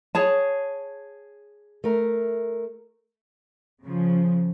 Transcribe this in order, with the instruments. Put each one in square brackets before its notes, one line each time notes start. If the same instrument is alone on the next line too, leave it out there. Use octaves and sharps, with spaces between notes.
[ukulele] G#4 C#5 A5
[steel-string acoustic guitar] A3 A#4
[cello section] C#3 F3